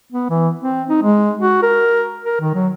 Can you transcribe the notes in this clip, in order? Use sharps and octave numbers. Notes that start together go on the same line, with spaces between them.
B3
E3
C4
D#4
G#3
F#4
A#4
A#4
D#3
F#3